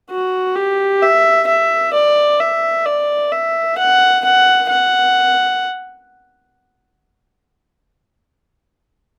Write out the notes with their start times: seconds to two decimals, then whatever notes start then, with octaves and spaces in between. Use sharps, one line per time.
0.11 F#4
0.56 G4
1.02 E5
1.48 E5
1.94 D5
2.40 E5
2.86 D5
3.32 E5
3.78 F#5
4.24 F#5
4.70 F#5